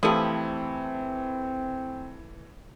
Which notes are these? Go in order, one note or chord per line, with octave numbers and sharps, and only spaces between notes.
E3 F3 A3 C4 E4 G4 A4 D#6